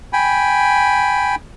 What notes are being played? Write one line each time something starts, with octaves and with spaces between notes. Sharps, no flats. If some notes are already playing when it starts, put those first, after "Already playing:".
G5 G#5 B5